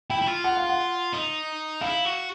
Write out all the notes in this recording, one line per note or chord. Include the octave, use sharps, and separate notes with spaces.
E4 G5
E4
F4
F#5
F5
F#5
D#4
E4 F5
F#4